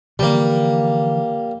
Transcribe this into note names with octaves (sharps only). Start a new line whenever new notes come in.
D3 E3 F3 G3 A#3